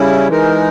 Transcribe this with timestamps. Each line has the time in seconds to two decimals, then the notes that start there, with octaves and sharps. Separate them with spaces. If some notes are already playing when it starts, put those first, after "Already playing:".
Already playing: C#3 G3 C#4 E4
0.28 E3 G#3 D#4 A#4